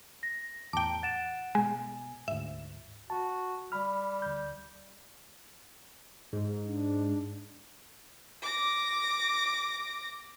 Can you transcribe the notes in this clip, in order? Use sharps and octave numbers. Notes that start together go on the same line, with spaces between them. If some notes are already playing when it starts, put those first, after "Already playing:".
A#6
E2 A2 G5 A5 A#5 D6 D7
F#5 A6 D7 E7
B2 G#3 G#5
D2 G#2 E5
F#4 A5
G3 B5 F6
D2 G6
G#2
D4
D6 A#6